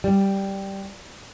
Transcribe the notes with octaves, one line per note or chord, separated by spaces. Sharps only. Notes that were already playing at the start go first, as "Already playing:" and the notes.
G3